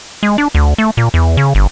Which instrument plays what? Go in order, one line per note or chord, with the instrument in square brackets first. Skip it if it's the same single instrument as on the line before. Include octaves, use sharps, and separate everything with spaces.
[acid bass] G#3
D4
D2
A3
A#2
E2
C#3
G1